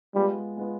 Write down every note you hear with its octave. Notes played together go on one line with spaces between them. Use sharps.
G3 G#3 B3 F4
G#3 B3 F4